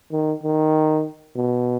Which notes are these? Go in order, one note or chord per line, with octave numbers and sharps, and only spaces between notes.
D#3
D#3
B2